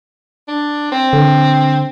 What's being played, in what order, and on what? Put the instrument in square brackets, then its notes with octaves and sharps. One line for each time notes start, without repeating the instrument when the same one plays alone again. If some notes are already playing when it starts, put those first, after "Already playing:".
[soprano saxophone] D4
C4
[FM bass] D3